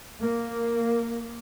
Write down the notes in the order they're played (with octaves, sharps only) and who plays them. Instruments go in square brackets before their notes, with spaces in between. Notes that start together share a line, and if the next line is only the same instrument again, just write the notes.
[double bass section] A#3